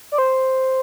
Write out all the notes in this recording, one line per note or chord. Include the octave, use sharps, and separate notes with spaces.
D5
C5